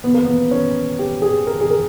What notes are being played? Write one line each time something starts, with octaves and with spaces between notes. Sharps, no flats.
B3
A#3
B3
C#4
G4
G#4
A#4
G#4
A#4